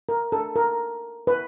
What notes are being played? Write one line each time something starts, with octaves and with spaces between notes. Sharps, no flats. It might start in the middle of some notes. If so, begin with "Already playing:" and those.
A#4
A4
A#4
B4